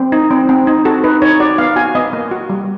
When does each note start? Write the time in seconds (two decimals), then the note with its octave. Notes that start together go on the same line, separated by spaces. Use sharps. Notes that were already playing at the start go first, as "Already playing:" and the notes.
Already playing: C4
0.12 D#4
0.31 C4
0.49 C4
0.67 D#4
0.85 F#4 A4
1.04 D#4 B4
1.22 D#4 C#5
1.40 F#4 D5
1.58 B3 F5
1.76 F#4 G#5
1.95 B3 D#5
2.13 A#3
2.31 F#4
2.50 G3